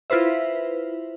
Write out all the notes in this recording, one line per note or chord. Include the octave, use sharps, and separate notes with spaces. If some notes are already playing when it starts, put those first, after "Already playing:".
E4 F4 B4 C5 E5